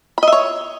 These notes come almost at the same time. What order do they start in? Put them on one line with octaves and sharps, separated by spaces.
B5 D#5 E5 C#5